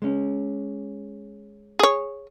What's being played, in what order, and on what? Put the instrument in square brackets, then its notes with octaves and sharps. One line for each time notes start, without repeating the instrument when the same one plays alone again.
[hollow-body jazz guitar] G#3 C#4
[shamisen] G#4 C#5